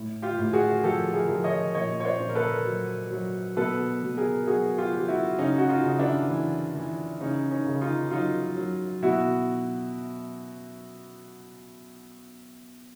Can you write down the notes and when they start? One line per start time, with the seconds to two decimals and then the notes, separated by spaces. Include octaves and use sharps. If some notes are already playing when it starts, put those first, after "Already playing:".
Already playing: A2
0.22 F4 G4
0.38 A2
0.53 F#4 G#4
0.84 F3 G4 A4
1.14 G#4 A#4
1.29 F3
1.44 C#5 D#5
1.75 A#2 C#5 D#5
2.00 C#5
2.05 C5 D5
2.20 A#2
2.29 A#4
2.35 A4 B4
2.65 F#3
3.11 F#3
3.57 B2 A4 B4
4.02 B2
4.17 G#4 A#4
4.47 F#3 F#4 G#4
4.78 F4 G4
4.93 F#3 G4
5.08 E4 F#4
5.38 C#3 C#4 D#4
5.58 F#4
5.69 D#4 F4
5.84 C#3
5.99 D4 E4
6.30 E3
6.75 E3
7.20 C#3 C#4 D#4
7.51 C#4 D#4
7.66 C#3
7.81 D#4 F4
8.11 F#3 D#4 F4
8.57 F#3
9.03 B2 E4 F#4